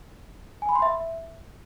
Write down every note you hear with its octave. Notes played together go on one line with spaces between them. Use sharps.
G#5
B5
C6
E5